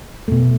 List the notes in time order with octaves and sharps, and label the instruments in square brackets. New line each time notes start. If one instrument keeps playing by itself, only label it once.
[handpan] B2 A3